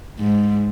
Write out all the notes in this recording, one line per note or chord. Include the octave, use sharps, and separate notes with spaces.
G#2